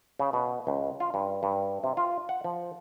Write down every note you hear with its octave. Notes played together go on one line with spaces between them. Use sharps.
C#3
B2
C#2
F4
G2
G2
C3
F4
F#5
F3